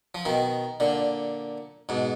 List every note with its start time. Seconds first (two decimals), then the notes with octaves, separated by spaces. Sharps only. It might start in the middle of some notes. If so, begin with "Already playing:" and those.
0.15 F3
0.25 B2 D#3
0.80 A#2 D3
1.89 G#2 B2